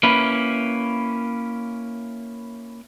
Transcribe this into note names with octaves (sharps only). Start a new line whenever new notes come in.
A#3 C#4 E4 B4